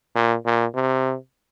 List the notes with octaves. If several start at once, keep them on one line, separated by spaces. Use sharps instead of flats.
A#2
A#2
C3